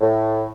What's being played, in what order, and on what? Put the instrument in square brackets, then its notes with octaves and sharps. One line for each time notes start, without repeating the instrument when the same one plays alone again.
[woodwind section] A2